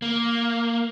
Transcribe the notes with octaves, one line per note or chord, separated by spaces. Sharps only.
A#3